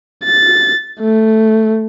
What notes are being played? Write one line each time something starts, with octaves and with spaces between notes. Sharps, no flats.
A6
A3